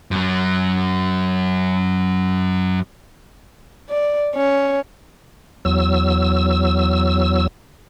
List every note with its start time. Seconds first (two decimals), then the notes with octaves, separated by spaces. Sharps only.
0.11 F#2 F#3
3.90 D5
4.36 C#4
5.65 E2 F#3 E6